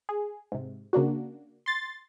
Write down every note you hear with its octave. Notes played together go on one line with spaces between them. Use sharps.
G#4
G#2 C3
C#3 A#3 D4 F#4
C6 A6